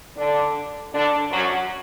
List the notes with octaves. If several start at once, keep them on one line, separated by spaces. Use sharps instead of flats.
D3 D4
D3 D4
F#2 F#3